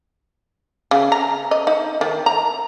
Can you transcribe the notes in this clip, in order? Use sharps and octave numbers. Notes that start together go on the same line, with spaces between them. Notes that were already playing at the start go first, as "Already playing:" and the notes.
C#3
A#5
D#5
D#4
D#3
A#5